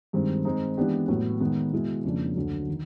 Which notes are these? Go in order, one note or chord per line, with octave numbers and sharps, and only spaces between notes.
G2 D#3 G#3 C4
D#3 G#3 C4 D#4
E3 G#3 B3 D4 G4
A2 F#3 B3
D#3 G#3 B3
B2 G#3 B3 E4
F2 C#3 F3 A#3 D4
D2 D3 F#3
D#3